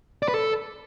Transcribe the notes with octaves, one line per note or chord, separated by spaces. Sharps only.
D5
B4
A4